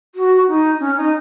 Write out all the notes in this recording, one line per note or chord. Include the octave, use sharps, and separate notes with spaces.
F#4
D#4
C#4
D#4